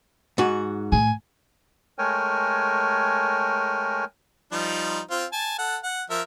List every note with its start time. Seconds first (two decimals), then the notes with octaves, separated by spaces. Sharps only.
0.38 G#2 F#4
0.92 A2 G#5
1.98 G#3 A3 A#4 C#5 G5 G#5
4.52 F3 G3 D#4
5.10 C4 F4
5.33 G#5 A5
5.59 A4 F#5
5.84 F#5
6.10 F3 A#4 E5